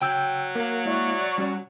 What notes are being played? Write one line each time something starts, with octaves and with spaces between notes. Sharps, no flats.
C#3 F#3 G5 E6 G6
A#3 A#4 F5
G#3 E4 D5 E5 C#6
G3 C#4 F#4